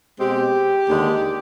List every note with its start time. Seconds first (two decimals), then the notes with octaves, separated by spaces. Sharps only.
0.20 B2 G#3 C4 G4
0.87 D#2 D3 G#3